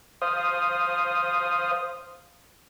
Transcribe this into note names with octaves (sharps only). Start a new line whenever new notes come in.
C5 F5 D#6